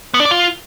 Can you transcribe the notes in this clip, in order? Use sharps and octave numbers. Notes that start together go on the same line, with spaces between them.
B3
D4
D5
F4